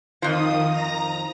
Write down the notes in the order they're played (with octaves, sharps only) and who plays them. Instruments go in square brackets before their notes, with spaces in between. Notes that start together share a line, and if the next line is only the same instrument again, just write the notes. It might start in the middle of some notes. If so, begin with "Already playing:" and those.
[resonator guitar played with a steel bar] F2 F3 [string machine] D#3 D#6
[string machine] A#5 A#6